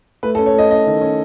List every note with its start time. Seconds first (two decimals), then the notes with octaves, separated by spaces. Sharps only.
0.23 A3 B4
0.35 A4
0.38 C#4
0.46 C#5
0.54 A3 D#5
0.70 C#4 D#5
0.87 D#3
1.01 C#4